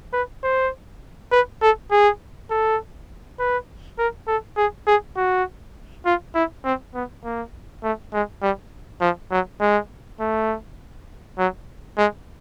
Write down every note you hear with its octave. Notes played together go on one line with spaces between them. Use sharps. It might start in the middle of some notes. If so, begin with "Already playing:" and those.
B4
C5
B4
A4
G#4
A4
B4
A#4
A4
G#4
G#4
F#4
F4
E4
C4
B3
A#3
A3
G#3
G3
F3
F#3
G#3
A3
F#3
G#3